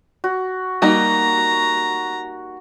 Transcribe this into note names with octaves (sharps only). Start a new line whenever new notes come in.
F#4
G3 A#3 D#4 F#4 A#5